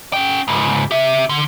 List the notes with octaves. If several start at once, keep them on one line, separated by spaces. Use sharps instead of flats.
C#4 G5
C#2 G#2
G4 E5
D3